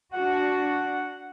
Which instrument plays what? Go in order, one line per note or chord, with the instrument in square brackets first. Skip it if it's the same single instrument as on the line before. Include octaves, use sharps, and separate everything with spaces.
[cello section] D4 F#4 [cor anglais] F#5